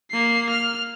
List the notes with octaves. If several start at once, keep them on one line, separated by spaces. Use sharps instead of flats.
A#3 C7
F6